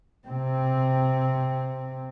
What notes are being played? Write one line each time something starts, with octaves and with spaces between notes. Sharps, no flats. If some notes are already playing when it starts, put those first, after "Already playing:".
C3 C4